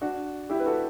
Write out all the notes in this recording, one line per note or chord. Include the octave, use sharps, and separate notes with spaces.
D4 F#4
E4 G4
B4
F#4 A4